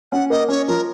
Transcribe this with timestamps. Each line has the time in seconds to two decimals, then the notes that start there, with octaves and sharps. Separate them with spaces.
0.12 C#4 F#5
0.30 A#3 D#5
0.48 C#4 C#5
0.68 F3 A#4